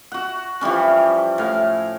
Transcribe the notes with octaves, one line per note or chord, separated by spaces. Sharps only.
F#4 F#5
E3 F3 G3 C#4
A2 F5